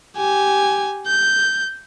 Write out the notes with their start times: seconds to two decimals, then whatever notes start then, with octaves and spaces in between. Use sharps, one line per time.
0.17 G4 G#5
1.07 G6